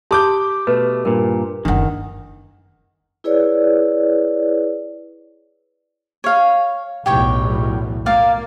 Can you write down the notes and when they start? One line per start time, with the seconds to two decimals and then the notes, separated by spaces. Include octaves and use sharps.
0.11 G4 A5 C6 D6 D#6 G6
0.67 B2 A3 B4
1.05 G2 A#2 A#4
1.65 F#1 D2 D#3 D4 F#5
3.24 E4 G#4 B4 C#5 D5
6.24 C#5 F5
7.06 B1 E2 A2 G4 C#5 G5
8.06 A#3 D5 F5